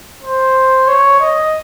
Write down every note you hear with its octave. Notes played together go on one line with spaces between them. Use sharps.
C5
C#5
D#5